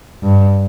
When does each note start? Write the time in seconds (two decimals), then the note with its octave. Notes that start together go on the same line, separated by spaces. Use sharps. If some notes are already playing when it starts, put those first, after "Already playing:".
0.24 G2